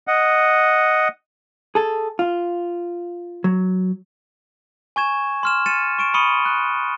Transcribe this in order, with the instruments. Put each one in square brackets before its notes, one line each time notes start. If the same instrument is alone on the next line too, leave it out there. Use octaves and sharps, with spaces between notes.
[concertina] D#5 F#5
[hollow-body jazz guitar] G#4 A4
F4
F#3
[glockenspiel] G#5 C#6 G#6 E7
C6 F6 E7
A6 C#7 D#7 E7
C#6 D7 E7
B5 C#6 D#6 C#7 D#7 G7
F#6